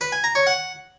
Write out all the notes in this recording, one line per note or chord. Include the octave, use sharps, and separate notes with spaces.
B4
G#5
A#5
C#5
F#5